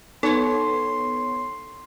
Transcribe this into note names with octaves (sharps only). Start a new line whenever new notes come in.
B3 D#4 A4 C#5 C6